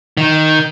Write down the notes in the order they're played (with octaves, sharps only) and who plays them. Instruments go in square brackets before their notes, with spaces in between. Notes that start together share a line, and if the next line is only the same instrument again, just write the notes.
[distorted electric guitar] D#3